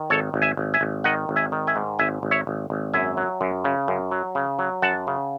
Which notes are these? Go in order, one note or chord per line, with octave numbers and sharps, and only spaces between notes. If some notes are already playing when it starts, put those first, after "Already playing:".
Already playing: D#3
G#1 A4 C#5
G#1
E5 G#5
G#1
E5 G#5
G#1
D#3 D#5 F#5
G#1
E5 G#5
D#3
E5 G#5
G#2
G#1 E5 G#5
G#1
C#5 E5
G#1
G#1
F#2 E5 G#5
F#3
F#2
C#3
F#2
F#3
C#3
F#3
F#2 F#5 A5
C#3